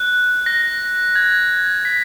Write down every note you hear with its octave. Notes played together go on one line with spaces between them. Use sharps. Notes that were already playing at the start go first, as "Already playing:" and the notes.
Already playing: F#6
A#6
G#6
B6